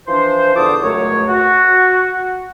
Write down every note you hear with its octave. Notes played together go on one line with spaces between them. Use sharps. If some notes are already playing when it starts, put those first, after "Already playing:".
E3 F3 D4 C5
E2 D3 F4 A4 D6 D#6
C#2 F#2 A3 C#5
F#4